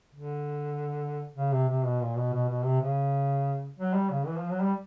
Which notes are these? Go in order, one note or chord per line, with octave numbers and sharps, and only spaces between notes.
D3
C#3
C3
C3
B2
A#2
B2
B2
B2
C3
C#3
F#3
G3
C#3
E3
F3
F#3
G3